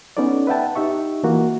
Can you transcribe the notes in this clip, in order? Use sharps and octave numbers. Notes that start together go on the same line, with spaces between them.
B3 C#4 D#4 A4 D5
B4 E5 F#5 G5 A5
D#4 G4 E5 C#6
E3 A#3 F#4